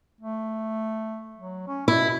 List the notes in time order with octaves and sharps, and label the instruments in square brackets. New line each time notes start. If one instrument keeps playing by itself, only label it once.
[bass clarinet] A3
F#3
C#4
[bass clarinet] B2 [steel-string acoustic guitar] E4